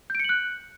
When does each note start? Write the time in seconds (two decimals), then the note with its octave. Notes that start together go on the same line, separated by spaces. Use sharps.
0.10 G6
0.15 D7
0.20 C#7
0.24 F#7
0.29 F#6